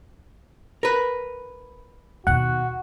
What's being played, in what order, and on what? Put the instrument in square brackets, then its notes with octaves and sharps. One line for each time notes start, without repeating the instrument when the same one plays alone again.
[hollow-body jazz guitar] A#4 B4
[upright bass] D#2 B2 [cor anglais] F#4 [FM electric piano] F#5